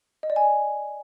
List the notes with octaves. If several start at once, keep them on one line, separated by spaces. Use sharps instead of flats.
D#5
D5
G#5